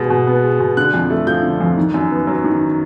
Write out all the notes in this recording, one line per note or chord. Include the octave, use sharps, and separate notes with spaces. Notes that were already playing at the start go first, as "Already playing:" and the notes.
Already playing: B2 G#3
B2
B3
G#3
B2
D3 F#6
F2
A3
F3 G6
D3
F2
D#3
F#2
B3
F#3
D#3